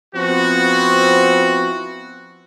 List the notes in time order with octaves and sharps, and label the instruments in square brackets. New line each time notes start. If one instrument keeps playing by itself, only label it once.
[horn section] F3 B3 C4 E4 F#4